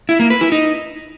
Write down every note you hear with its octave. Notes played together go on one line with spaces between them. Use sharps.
E4
A#3
B4
E4
D#4